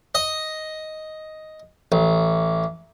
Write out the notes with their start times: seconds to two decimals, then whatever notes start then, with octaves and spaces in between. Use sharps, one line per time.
0.15 D#5
1.92 A1